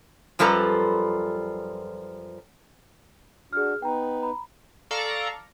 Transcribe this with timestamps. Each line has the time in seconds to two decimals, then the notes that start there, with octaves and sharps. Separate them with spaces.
0.39 F#2 F3 G3 A4 B4 A#5
3.53 D4 F#4 G#4 F6
3.82 B3 D#4 B4 G5 A#5
4.23 A#5 B5
4.91 A4 D5 F5 A#5 C#6